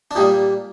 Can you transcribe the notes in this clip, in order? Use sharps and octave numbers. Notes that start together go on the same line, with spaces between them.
D4
A#2 G3 A#3 D#4